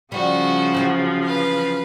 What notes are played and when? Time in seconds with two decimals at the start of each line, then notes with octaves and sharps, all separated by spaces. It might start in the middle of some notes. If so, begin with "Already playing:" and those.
0.12 C#3 F3 G3 F#4 C5
0.75 E3 F#3 C4
1.23 B4 F5